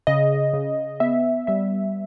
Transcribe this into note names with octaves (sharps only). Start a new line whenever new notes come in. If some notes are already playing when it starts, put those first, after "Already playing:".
C#3 D#5
C#3
B3 E5
G3 E5